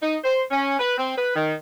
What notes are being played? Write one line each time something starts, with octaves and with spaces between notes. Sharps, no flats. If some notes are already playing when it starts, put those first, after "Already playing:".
D#4
C5
C#4
B4
C4
B4
D#3